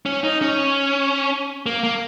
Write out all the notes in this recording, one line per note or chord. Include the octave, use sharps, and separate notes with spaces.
C#4
D#4
C#4
A#3
A#3